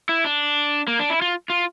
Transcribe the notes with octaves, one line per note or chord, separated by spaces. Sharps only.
E4
D4
A#3
D4
E4
F4
F4